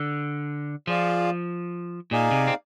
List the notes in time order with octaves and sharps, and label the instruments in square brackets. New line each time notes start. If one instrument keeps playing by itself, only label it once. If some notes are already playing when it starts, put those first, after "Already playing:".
Already playing: [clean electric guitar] D3
[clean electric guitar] F3 [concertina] F4 G#4 D5 F5
[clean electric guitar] A#2 [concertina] D#4 G#4 D5 F5 G#5
[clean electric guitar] C3
C4